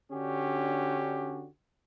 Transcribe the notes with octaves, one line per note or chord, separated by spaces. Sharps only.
D3 C#4 D4 F#4 G4